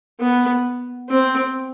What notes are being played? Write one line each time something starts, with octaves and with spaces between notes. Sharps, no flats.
B3
C4